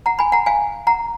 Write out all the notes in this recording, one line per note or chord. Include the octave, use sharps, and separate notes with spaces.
F#5 A#5
G#5 B5
F#5 A#5
F5 G#5
F#5 A#5